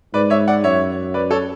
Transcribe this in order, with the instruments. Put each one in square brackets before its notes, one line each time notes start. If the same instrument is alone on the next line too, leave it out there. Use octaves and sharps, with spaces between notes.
[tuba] G#2 [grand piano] B4 D5
[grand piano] C#5 E5
D5 F#5
[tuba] F#2 [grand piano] C#5 E5
[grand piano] B4 D5
A4 C#5